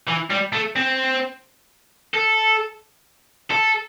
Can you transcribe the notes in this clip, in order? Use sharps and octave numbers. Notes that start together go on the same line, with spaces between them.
E3
G3
A3
C4
A4
A4